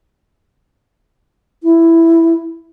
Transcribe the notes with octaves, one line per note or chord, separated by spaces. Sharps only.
E4